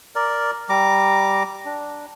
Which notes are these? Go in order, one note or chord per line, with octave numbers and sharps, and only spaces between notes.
A#4 D5
G3 A#5 D6
D4